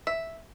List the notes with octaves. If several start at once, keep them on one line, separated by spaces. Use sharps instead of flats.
E5